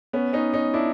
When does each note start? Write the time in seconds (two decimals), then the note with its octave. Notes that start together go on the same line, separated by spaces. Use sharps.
0.13 B3 C#4
0.33 C#4 D#4
0.53 C#4 D#4
0.74 D4 E4